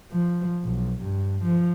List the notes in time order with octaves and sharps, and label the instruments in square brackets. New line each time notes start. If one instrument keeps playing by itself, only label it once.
[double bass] F3
B1
G2
F3